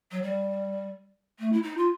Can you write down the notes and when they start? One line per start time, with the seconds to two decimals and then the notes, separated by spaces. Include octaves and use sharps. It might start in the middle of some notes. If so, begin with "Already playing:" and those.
0.11 F#3
0.22 G3
1.39 A3
1.52 E4
1.62 D#4
1.77 F4